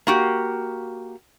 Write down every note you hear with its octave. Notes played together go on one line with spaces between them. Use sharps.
A#3 F#4 G4